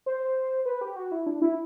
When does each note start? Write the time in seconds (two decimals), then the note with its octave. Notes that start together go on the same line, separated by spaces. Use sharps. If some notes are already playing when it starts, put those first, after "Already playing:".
0.06 C5
0.66 B4
0.81 G4
0.96 F#4
1.12 E4
1.26 D4
1.42 E4